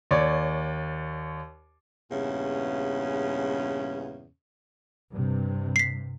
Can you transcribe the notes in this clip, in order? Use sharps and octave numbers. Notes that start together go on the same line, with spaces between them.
D#2 C#5 D5
E2 G2 A#2 C#3 C#4
G2 C3
B6 C7